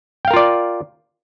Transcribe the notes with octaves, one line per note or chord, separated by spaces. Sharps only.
F4 A#4 D5 F5 G5